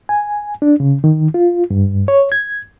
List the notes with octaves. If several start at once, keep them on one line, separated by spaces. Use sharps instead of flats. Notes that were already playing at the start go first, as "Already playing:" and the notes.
G#5
D4
C#3
D#3
F4
G2
C#5
G#6